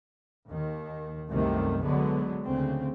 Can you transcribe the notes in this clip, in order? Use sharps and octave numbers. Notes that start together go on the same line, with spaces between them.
D#2 D#3
C2 F#2 C3 D#3 A3
D3 F#3 G#3 B3
D2 C#3 C4